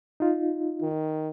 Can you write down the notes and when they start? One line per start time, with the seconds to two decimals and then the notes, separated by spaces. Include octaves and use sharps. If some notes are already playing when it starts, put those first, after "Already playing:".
0.20 D#4 F4
0.82 D#3